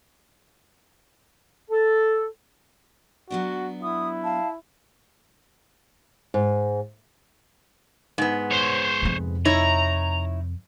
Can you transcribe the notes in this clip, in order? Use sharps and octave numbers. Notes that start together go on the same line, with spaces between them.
A4
F#3 B3 D4 F#4
E4 D#6
F5 A5
G#2
G#2 B3
C5 C#5
F2 C3
D#4 E4 C#5 A#5